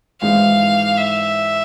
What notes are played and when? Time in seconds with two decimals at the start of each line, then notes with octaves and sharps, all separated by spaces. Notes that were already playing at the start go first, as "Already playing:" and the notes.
0.21 G#1 G#2 E3 G#3 F5
0.98 E5